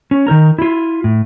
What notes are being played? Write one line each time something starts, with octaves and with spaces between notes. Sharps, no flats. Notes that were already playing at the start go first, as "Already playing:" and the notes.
C#4
D#3 D#4 A#4 A#5
E4 F4
A2